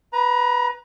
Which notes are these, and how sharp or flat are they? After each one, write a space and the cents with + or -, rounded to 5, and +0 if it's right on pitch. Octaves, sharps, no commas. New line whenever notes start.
B4 +0 A#5 +30